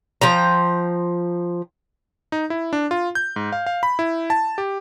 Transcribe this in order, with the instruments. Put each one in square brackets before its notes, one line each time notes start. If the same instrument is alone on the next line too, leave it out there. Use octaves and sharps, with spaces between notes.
[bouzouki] F3 G5 A#5
[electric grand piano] D#4
E4
D4
F4
G6
G#2
F5
F5
B5
E4
A5
G4